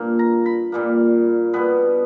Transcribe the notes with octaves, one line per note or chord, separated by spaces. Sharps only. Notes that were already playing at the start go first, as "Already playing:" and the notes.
Already playing: G2 A#2 A#3
A#5
B5
A#2 G3 A#3
B2 G3 B3 B4